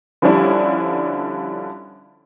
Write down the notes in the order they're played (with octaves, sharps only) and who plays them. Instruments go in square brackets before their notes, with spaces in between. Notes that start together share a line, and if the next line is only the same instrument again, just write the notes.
[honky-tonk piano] D3 F3 G3 C#4 D4 E4